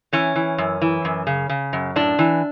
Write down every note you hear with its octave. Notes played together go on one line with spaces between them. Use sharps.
E3 C#4
E3
F#2
E3
F#2
C#3
C#3
F#2
A2 D4
E3